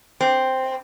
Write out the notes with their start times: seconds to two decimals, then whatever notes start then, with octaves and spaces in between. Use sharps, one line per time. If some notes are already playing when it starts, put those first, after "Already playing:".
0.21 C4